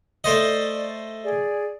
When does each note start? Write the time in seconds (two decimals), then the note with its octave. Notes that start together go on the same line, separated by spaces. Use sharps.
0.24 A3 C5 D5 D#5
1.23 G#4 D5